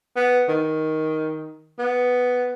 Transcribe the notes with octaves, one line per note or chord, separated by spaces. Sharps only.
B3
D#3
B3